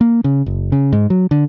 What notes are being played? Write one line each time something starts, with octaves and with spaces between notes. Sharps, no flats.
A#3
C#3
F#1
C#3
G#2
F#3
D3